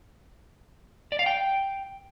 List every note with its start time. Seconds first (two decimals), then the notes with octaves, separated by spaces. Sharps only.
1.12 D5
1.19 F5
1.26 G5